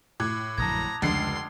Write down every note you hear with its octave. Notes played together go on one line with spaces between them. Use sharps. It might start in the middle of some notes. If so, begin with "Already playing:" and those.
A2 D6 F#6 G#6
A#1 F#2 D3 A5 A#5 D#6 G#6
F1 C#2 D3 C6 C7